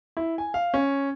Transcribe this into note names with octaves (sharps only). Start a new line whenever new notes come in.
E4
G#5
F5
C#4